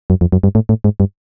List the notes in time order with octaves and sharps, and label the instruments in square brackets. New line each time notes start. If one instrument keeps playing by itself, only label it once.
[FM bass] F#2
F2
F#2
G2
A2
A2
G#2
G2